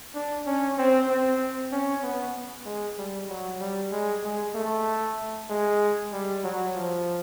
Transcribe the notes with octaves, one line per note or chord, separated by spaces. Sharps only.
D4
C#4
C4
C4
C#4
B3
G#3
G3
F#3
G3
G#3
G#3
A3
G#3
G3
F#3
F3